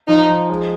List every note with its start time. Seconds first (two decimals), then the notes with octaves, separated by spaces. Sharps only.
0.08 F3 D#4
0.28 F3
0.49 G#3